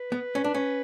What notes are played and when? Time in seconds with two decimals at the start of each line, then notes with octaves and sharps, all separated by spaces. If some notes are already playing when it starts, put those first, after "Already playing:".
Already playing: B4
0.12 B3
0.35 C#4
0.44 D4
0.54 C#4